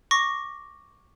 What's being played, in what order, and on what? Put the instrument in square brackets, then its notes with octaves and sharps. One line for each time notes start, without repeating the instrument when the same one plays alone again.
[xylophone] C#6 D6 A#6